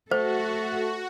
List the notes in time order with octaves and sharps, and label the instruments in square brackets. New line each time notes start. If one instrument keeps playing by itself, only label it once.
[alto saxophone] A3 [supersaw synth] F#4 [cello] A4 [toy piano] C5